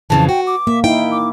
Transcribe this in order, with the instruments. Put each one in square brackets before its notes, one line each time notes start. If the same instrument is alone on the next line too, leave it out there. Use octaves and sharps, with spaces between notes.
[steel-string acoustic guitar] F2 C#3 E3 [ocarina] A5
[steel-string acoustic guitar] F#4 [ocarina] G5
[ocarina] D6
[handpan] A#3 [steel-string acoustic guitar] E5
[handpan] D#4 E4 [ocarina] F5 [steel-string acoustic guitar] G5
[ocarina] D6